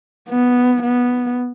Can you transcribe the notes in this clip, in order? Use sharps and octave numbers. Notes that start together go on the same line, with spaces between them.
B3
B3